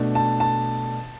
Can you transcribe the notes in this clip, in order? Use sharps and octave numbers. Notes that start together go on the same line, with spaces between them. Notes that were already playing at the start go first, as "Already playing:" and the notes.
Already playing: B2 A3 D4
A5
A5